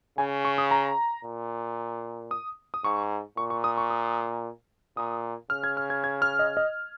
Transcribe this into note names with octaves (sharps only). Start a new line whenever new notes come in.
C#3 G#5
C#6
D#6
A#5
A#2
D#6
D#6
G#2 C#6
A#2 C#6
C#6
D#6
C#6
D#6
A#2 D#6
C#3 F6
G#6
F6
G#6
G#6
F6
D#5
D#5